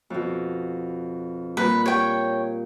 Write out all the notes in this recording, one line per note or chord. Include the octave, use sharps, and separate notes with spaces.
F2 B2
A#2 G3 B4
G4 C#5 G5